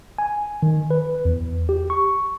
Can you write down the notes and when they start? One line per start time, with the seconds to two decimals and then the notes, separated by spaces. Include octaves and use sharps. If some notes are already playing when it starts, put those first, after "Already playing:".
0.18 G#5
0.63 D#3
0.91 B4
1.25 E2
1.69 G4
1.90 C#6